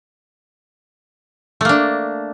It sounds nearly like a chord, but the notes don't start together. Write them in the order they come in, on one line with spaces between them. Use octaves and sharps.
A3 A#3 D4